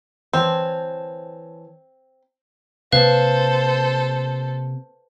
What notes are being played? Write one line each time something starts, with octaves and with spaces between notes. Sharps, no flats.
E3 C4 C#5 A5
C3 A#3 A4 B4 C5 F5